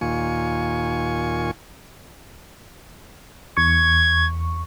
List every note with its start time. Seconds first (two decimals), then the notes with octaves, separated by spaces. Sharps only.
0.01 D#2 A#2 F4 G#5 C#6
3.57 E2 C#6 G#6